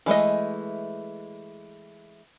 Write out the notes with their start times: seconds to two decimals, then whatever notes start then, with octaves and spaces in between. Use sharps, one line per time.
0.06 E3 G#3 A3 D#5